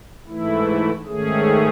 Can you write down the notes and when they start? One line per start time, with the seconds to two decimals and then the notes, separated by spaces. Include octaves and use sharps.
0.27 G#2 E3 A3 E4
1.07 G#2 D#3 A3 C#4 G#4